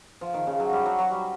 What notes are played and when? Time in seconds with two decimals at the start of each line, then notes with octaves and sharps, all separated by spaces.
0.21 F3
0.34 D#3
0.47 C#3
0.60 F#3
0.73 G3
0.86 F#3
0.99 F#3
1.11 G3